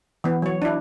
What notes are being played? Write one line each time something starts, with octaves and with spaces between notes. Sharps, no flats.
E3 B3
F#3 C#5
D4 E4